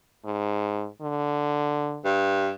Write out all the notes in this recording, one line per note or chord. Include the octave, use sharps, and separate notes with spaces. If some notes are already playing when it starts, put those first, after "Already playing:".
G#2
D3
G2